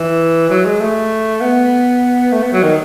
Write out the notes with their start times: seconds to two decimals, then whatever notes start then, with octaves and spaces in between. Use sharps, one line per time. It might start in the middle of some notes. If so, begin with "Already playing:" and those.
Already playing: E3
0.50 F#3
0.65 G#3
0.80 A3
1.41 B3
2.32 A3
2.42 B3
2.53 F#3
2.63 D#3